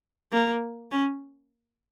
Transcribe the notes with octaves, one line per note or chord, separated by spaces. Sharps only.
A#3
C#4